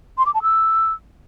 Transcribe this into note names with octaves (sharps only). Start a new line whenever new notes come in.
C6
D6
A5
E6